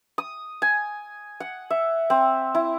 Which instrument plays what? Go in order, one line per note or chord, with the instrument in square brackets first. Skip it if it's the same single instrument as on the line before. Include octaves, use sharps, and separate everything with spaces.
[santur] D#6
G#5
F#5
E5
C4
E4